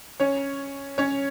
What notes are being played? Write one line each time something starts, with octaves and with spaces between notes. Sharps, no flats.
C#4 C#5
C#4 C#5